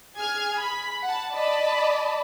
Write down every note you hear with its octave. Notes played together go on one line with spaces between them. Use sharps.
G#4 F6 G#6
B5
F#5 A5
D5 D#5 A5 B5